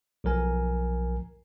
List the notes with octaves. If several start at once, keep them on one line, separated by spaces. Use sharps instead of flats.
B1 F3 A#4 G#5